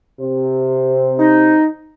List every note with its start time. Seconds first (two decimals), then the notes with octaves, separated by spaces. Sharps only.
0.20 C3 C5
1.19 D#4